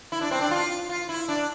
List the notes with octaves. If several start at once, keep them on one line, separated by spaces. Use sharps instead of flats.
E4
D4
C4
D4
F4
F4
E4
D4